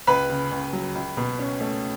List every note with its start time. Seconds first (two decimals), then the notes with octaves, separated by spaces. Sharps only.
0.07 C#2 B4 B5
0.30 C#3
0.51 C#2
0.73 F#3
0.95 C#2
1.17 B2
1.39 C#4
1.61 A3